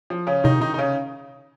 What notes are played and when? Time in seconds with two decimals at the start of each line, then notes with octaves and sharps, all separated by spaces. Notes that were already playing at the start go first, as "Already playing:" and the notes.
0.10 F3
0.27 C#3 C#4
0.44 C3 D#3 D#4
0.61 D#3 D#4
0.74 D#4
0.78 C#3 C#4